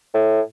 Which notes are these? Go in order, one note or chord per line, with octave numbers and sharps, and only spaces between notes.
A2